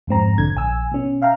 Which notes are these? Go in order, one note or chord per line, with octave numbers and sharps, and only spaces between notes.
F2 G#2 C4 A#5
B1 D3 G#6
A#1 G#5 E6
B2 C#4
E5 F5 G5 A#5